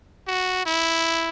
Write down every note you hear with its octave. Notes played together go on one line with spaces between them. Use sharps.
F#4
E4